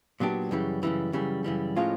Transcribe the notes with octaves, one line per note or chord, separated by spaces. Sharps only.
A#2 F#3 B3 D4 G4
F#2 C#3 E3 G3
F#2 C#3 E3 G3
F#2 C#3 E3 G3
F#2 C#3 E3 G3
A2 F3 G#3 C#4 F4